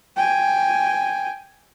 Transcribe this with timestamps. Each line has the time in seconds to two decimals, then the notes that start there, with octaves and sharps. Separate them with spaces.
0.17 G5 G#5